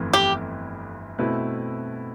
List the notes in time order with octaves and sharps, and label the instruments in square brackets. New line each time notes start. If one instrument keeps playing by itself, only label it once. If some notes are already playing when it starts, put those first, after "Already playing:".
Already playing: [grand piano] G1 F2 E3 A3 E4
[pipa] G4
[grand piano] B2 A3 C4 E4 B4